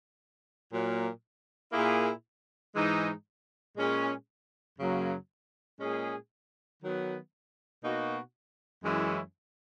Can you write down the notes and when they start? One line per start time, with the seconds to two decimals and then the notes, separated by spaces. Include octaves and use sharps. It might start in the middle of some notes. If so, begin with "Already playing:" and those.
0.71 A#2 F#3 A#3
1.73 A#2 A#3 E4 G#4
2.75 G#2 E3 G#3 D#4
3.76 A#2 G#3 C#4 G#4
4.77 F#2 C#3 F#3 A#3
5.79 A#2 G#3 C#4 G#4
6.80 D#3 F#3 B3
7.82 B2 A#3 D#4 F#4
8.83 F#2 E3 G#3 C#4 E4